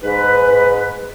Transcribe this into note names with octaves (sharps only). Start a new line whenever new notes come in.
G#2 B4